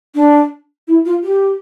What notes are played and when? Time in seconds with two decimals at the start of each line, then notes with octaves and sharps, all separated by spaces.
0.15 D4
0.88 E4
1.05 F4
1.23 G4